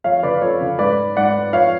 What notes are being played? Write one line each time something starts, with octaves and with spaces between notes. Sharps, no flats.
F2 C#5 F5
C#3 B4 D5
F2 A4 C#5
C#3
G#2 B4 D5
G#2 D5 F#5
F2 C#5 F5